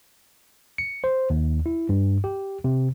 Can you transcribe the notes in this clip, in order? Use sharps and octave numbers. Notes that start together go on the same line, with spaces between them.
C#7
C5
D#2
E4
G2
G4
C3